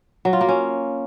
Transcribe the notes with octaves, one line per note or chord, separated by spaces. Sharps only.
F#3
F4
A#3
C#4